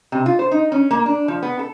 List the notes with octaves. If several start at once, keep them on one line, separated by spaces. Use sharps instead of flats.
C3
F4
C5
D#4
C#4
A#3
D4
F3
B3
A4